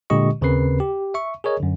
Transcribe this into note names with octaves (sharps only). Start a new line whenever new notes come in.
A#2 D3 G#3 G4 D#5 C#6
D#2 C#3 C4 A#4 B4 C7
G4
E5 C#6
G#4 A#4 C#5 D#5
F#2 D3